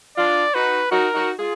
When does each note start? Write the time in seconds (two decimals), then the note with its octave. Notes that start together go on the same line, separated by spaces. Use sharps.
0.18 D4 F4 D5
0.55 D#4 F#4 B4
0.91 D#4 F#4 A#4
1.15 D#4 F#4
1.39 F4 G#4